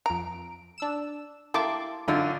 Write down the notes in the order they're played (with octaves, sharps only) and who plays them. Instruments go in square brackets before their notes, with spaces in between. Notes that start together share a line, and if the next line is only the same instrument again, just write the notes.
[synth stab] F2 D7 [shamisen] A#5
[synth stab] D4 E6 E7
[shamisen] A3 A#3 G4 [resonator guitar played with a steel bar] E4 A4 [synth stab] A5 C6 D6
[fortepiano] F#2 D3 F4 [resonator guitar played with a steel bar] F#3 D4 D#4